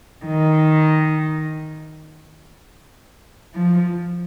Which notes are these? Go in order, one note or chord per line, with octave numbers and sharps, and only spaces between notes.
D#3
F3